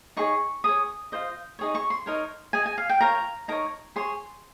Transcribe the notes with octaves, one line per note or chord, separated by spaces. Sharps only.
D#4 G#4 C#5 C#6
G#4 C#5 D#6
F4 C5 D#5
D#4 G#4 C#5
C#6
C6
D#4 A#4 C#5
G#4 D#5 G#5
G#5
F5
G5
F4 A#4 C#5 A#5
D#4 A#4 C#5 A#5
G#4 C#5 C6